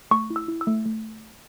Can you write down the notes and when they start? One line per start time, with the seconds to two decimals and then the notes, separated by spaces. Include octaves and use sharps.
0.11 A3 C#6
0.30 E4
0.36 E6
0.48 E4
0.61 E6
0.67 A3
0.86 A3